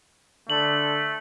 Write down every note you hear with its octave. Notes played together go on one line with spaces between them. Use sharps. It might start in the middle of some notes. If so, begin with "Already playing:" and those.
D3 A3 F#7